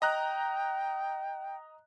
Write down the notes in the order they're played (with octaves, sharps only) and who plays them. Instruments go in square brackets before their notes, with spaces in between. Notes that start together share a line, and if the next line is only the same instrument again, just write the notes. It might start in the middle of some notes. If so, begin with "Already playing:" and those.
[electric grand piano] D#5 A#5 F#6 [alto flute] G5